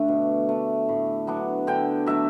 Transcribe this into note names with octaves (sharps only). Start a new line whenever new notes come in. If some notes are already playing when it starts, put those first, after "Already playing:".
Already playing: D3 A3 D4
B2
A3 D4
A2
F#3 B3 D4
D3 G5
F#3 A3 D4 E5